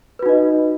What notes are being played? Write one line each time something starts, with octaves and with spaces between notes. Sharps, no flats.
D#4 F#4 B4 D#5